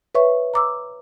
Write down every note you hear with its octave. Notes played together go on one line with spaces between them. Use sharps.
B4 C#5 E5 C#6
A#5 D6 E6